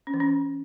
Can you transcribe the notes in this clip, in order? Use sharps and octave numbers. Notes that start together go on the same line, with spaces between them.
C#4
E3
C#4